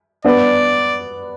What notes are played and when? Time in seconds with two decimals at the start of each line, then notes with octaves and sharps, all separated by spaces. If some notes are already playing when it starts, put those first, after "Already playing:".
0.25 B3 D4 D5